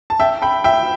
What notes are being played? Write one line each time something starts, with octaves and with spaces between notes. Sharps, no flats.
A5
E5 G5
G5 B5
E5 G5